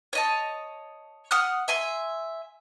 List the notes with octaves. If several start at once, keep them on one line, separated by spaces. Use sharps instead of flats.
C#5 D#5 A5
F#5 D#6 F6 F#6
E5 G#5 C6